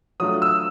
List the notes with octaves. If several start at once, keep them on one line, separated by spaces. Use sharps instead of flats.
F#3 A3 D4 F4 D#6
E6